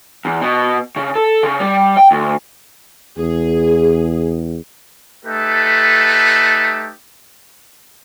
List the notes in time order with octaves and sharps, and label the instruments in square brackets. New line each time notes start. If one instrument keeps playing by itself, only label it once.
[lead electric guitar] E2
B2
C#3
A4
C#3
G3
G5
D2
[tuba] E2 [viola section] G#4
[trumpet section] A3 D#4 G4 A4 B4